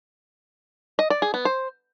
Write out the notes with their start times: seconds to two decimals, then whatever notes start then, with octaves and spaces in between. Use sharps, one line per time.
0.99 D#5
1.10 D5
1.22 G#4
1.34 B3
1.45 C5